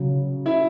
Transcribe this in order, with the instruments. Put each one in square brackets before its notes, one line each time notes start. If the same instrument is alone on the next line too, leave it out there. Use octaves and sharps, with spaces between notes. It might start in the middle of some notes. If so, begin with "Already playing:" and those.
Already playing: [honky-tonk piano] C#3 F#3
[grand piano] E4 E5